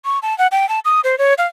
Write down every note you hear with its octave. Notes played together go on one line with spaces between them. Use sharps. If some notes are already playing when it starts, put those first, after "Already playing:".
C#6
A5
F#5
G5
A5
D#6
C5
C#5
F5